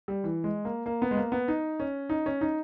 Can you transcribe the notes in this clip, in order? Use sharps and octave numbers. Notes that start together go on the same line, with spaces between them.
G3
E3
G#3
A#3
A#3
B3
G#3
A#3
B3
D#4
C#4
D#4
C#4
D#4